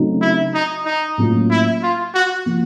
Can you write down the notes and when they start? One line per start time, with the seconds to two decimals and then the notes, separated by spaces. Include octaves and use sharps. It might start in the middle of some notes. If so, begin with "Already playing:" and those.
Already playing: C#3 F#3 A3 C4 D#4
0.21 E4
0.54 D#4
0.86 D#4
1.18 A2 F#3 A#3 C#4 F4
1.50 E4
1.83 F4
2.14 F#4
2.46 F3 A#3